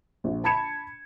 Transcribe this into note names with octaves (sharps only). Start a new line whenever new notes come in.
A#1
A5 B5 G#6 C#7 E7